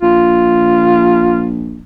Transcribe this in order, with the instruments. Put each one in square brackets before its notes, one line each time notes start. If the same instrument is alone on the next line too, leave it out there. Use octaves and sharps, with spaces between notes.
[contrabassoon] A#1 [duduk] F4